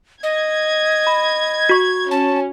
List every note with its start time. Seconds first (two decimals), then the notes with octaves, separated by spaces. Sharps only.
0.23 D#5 G#6
1.07 B5
1.69 F#4 C#6
2.11 C#4 A5